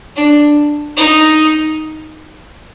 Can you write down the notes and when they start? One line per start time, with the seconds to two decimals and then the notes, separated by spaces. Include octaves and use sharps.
0.16 D4
0.97 D#4